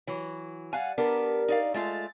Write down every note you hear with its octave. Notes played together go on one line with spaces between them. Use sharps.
E3 F#3
G3 F5 F#5 G#5
B3 D4 G4 A#4
D#4 D5 F5
G#3 A3 F4 A6